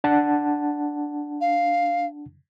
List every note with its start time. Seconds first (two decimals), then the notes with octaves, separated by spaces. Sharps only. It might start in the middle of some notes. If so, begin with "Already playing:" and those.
0.04 D4 F#5 A5
1.41 F5